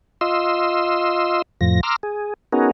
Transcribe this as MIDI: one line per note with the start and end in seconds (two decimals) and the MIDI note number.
0.21 1.42 65
0.21 1.42 75
0.21 1.42 84
0.21 1.42 88
1.61 1.81 41
1.61 1.81 45
1.61 1.81 53
1.61 1.81 94
1.83 1.96 82
1.83 1.96 84
1.83 1.96 86
1.83 1.96 88
1.83 1.96 89
2.03 2.34 68
2.52 2.71 59
2.52 2.71 61
2.52 2.71 63
2.52 2.71 66
2.52 2.71 68
2.52 2.71 70